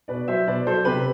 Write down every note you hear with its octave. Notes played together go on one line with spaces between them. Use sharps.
B2 B4 D5
F#3 C5 E5
B2 B4 D5
F#3 A4 C5
C3 G4 B4